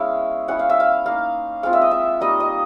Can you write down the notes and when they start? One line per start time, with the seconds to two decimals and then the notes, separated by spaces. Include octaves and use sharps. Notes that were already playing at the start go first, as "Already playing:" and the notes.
Already playing: G#3 B3 C#4 E4 F5
0.48 G#3 C#4 E4 F#5
0.59 F5
0.70 E5
0.80 F5
1.06 A#3 D#4 F5
1.63 G#3 C4 F4 F5
1.73 E5
1.82 D#5
1.91 E5
2.20 G3 A#3 D#4 D#5
2.40 D#5